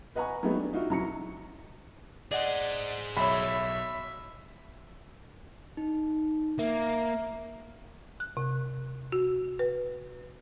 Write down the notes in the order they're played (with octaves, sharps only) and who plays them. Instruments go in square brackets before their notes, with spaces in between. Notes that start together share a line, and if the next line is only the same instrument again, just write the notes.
[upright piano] B4 D#5 F#5 G#5 A#5 C#6
F#3 G#3 A3 B3 D#4 G4
D4
D#4 F4 F#4 E5
C#2 F#3 E4 A#5 C#6 C#7
[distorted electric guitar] G#4 C5 [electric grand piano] D5 D#5 F#5
[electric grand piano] B1 C#5 [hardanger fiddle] E5 [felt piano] B5
[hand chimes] D#4
[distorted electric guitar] A#3 [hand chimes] E5
[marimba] F#6
C3
F#4
B4